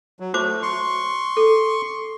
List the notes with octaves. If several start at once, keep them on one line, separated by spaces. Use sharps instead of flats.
F#3
A3 F#4 C5 D6
C6 C#6
A4